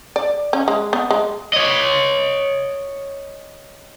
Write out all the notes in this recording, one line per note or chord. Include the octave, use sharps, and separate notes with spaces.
D5
C#4
G#3
B3
G#3
C#5 D#5